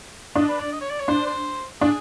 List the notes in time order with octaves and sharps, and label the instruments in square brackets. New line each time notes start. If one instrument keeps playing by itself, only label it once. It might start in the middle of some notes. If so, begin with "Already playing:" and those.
[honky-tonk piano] D4 [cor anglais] D#5
[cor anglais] B4
D5
D#5
C#5
D5
C#5
[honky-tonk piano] D4 [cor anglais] C5
[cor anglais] C5
[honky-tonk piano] D4 [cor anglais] G#4